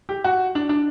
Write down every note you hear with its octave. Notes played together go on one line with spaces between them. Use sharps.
G4
F#4
D4
D4